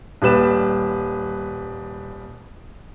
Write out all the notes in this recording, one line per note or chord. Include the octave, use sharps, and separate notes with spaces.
D#1 G3 B4 E7